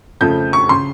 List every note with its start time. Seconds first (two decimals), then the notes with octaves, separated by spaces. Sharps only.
0.21 F2 C#3 F3 A3 G6
0.53 C#6
0.69 C#3 C6